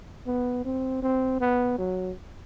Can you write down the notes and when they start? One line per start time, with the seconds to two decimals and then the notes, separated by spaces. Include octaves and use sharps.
0.27 B3
0.65 C4
1.03 C4
1.40 B3
1.78 F#3